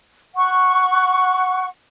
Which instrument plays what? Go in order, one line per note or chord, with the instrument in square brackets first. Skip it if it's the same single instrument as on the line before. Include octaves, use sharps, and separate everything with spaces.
[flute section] F#5 C#6